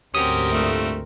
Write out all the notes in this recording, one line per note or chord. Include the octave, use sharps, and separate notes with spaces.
D2 G#2 C4 C#4 F#4 G4 A#4 D#6
G2 A#2 A3